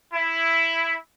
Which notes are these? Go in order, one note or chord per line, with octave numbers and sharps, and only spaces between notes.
E4